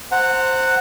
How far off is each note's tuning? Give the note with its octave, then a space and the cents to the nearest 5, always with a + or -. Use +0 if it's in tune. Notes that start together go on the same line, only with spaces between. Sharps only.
C5 +0 F#5 +0 A#5 -40